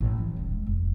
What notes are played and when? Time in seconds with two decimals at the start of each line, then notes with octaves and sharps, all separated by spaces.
0.01 A1 A#2
0.18 F3
0.36 D#1 C#2
0.51 G#3
0.67 F1